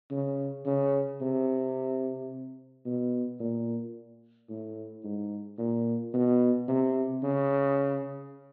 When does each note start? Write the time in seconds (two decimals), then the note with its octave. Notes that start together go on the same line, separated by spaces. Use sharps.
0.11 C#3
0.66 C#3
1.21 C3
2.86 B2
3.40 A#2
4.50 A2
5.04 G#2
5.58 A#2
6.14 B2
6.68 C3
7.23 C#3